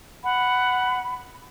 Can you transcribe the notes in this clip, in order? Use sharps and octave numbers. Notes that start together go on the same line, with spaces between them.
F#5 B5